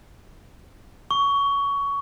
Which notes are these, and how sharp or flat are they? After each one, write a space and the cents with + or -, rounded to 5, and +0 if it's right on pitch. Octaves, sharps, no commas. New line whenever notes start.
C#6 +20